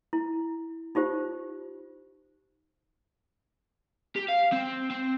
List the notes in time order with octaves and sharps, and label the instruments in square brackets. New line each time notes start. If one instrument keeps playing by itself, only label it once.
[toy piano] E4
D#4 F4 G4 C5
[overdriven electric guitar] G4
F5
C4
C4